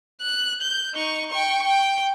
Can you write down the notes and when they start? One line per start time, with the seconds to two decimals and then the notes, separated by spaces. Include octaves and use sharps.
0.21 F#6
0.61 G6
0.94 D#4 C#6
1.31 G5 C#6
1.65 G5